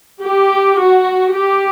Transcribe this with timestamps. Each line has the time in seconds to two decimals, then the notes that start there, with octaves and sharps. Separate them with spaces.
0.22 G4
0.77 F#4
1.32 G4